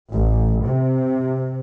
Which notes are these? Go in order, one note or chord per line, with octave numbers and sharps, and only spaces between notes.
A1
C3